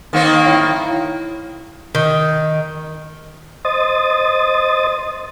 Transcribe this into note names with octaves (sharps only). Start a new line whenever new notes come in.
D#3 A#3 C4
E4 C#5 F5
D#3
C5 D#5 D#6 A6